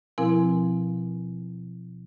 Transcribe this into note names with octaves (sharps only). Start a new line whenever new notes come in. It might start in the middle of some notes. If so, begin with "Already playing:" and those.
B2 F3 C4 E4 A#4 G#5